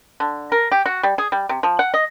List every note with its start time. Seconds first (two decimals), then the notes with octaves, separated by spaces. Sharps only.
0.20 D3
0.52 A#4
0.72 G4
0.86 F#4
1.03 G3
1.18 G#4
1.32 G3
1.49 C3
1.63 F3
1.79 F#5
1.94 D#5